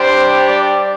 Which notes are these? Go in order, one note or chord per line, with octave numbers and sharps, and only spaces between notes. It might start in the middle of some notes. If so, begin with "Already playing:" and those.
Already playing: G3 D4 G4 C5
D5